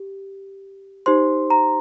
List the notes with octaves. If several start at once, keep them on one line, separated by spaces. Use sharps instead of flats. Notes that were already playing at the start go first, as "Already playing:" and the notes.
Already playing: G4
D#4 G4 C5 C6
A#5